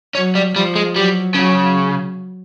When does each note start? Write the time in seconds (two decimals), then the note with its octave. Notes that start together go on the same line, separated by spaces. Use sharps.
0.15 F#3 C#4
0.35 G3
0.55 F3 G3
0.76 G#3
0.96 F#3 G3
1.35 C#3 F#3